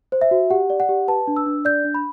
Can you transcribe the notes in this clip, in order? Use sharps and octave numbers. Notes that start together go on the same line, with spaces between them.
C5
E5
F#4
G4 F#5
D5
F#5
G4
B4 A5
D4
E6
D4
D5 G6
D4
B5